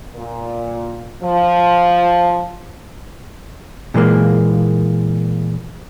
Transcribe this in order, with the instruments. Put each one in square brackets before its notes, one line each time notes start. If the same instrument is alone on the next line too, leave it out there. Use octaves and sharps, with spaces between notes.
[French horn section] A#2
F3
[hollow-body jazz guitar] A#2 E3 G#3 A#3